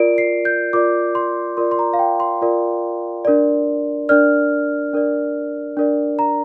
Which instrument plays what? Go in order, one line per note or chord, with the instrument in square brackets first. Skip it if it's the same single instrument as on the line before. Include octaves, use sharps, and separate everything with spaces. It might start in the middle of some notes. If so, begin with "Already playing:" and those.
Already playing: [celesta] F4 A#4 D5 D7
C7
G6
F4 A#4 D5 D6
C6
F4 A#4 D5 C6
C6
A#5
F5
G5
C6
F4 A#4 D5
D4 A#4 D5
D4 A#4 D5 F6
D4 A#4 D5
D4 A#4 D5
A#5